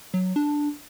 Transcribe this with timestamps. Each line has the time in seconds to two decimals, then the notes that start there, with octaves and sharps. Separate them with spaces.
0.14 F#3
0.36 D4